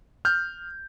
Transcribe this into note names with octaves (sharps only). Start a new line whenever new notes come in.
F6 G6